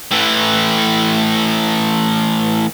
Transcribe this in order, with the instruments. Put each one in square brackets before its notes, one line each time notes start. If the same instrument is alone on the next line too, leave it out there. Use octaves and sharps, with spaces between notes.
[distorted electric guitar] A2 E3